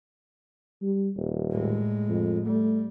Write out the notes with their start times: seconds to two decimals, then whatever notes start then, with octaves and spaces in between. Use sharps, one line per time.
0.82 G3
1.16 D#1
1.51 A2 G#3
2.09 F2
2.46 G3 A3